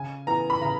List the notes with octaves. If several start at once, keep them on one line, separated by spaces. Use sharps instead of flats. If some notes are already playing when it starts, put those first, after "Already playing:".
Already playing: C#3 G#5
E3 B3 A#5
B5
C#3 A#5